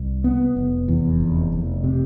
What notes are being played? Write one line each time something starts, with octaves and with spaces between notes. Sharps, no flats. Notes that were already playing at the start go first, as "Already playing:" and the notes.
Already playing: C2
B3
F1
E2
F1
F1
C3